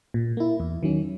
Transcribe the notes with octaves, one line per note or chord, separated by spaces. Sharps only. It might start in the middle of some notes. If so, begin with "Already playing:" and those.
A#2
A#3 E4
E2
D#3 F#3 C#4